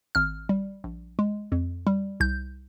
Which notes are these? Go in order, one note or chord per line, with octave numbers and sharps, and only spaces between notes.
G#1 F6
G3
A#1
G#3
F2
G3
C2 G6